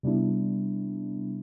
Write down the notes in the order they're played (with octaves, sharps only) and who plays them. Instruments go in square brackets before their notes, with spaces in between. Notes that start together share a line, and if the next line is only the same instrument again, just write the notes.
[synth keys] C3 G3 B3 D4 E4